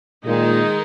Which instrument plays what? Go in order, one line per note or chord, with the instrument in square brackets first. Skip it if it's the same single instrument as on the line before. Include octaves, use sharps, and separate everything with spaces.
[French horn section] A#2 [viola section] D#3 G#3 D#4